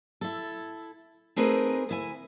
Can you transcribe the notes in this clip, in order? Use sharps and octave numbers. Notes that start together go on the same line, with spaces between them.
E4 A4
A3 C4 D#4 G#4 A#4 B4
D2 E4 G#5